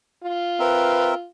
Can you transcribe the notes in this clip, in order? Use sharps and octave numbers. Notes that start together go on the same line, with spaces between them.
F4
C4 A#4 B4 E5